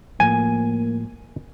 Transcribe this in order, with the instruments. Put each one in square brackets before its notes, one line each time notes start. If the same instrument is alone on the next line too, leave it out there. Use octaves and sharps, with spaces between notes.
[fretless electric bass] A2 F3 [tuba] A#3 [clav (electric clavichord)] G#5